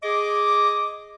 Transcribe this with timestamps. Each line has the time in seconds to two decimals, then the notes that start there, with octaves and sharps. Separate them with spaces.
0.04 G#4 D#5 D6